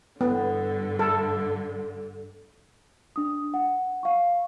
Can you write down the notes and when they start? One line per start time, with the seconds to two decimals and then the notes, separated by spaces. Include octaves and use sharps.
0.21 G2 D3 B3
0.99 A4
3.16 D4 D#6
3.54 F#5
4.03 F5 C#6